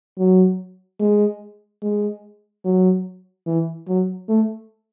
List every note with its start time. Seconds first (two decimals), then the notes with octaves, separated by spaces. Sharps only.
0.18 F#3
1.00 G#3
1.82 G#3
2.65 F#3
3.46 E3
3.88 F#3
4.28 A3